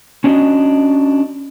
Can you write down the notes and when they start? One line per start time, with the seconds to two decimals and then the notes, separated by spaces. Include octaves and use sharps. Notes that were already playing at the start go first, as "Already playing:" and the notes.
0.24 C#4 D4 F#4 D#5